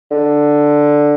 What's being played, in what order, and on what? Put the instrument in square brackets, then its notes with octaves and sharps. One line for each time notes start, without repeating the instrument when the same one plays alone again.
[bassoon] D3